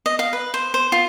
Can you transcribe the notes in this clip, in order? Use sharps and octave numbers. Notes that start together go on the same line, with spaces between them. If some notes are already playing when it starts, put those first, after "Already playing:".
D#5
F5
B4
C5
C5
F4